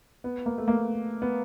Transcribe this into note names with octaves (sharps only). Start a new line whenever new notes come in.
B3
A#3
A3
A#3
B3